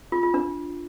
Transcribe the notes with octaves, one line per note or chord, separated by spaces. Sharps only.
F4
F4
D4